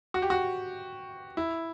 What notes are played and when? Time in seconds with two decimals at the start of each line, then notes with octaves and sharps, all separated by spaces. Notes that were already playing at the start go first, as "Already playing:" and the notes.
0.14 F#4
0.22 G4
0.30 F#4
1.37 E4